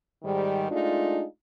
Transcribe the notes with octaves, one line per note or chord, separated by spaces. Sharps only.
G#2 D#3 G3
G#3 A3 D4 D#4 F4